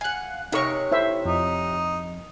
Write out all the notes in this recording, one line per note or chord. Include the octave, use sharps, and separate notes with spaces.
F5 F#5 G#5 F#6
C3 D#4 A#4 C#5 C#6
E4 C5 E5
F2 D#4